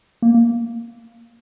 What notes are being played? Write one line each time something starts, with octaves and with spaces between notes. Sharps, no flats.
A#3
A#3